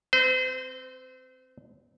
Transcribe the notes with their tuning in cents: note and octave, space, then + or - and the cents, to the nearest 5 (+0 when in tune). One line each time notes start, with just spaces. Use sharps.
C4 +0 C5 -35